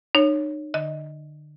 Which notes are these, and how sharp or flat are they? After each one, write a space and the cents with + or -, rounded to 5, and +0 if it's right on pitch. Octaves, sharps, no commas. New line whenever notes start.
D#4 -40 C#5 +0
D3 +30 D#5 +20